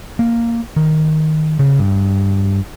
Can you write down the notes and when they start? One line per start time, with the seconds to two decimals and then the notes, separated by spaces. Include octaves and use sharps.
0.19 A#3
0.76 D#3
1.59 C#3
1.79 G2